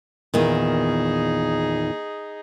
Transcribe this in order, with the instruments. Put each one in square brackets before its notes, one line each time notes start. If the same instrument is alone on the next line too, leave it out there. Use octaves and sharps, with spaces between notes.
[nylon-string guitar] E2 A#2 D#3 [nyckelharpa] D#4 G#4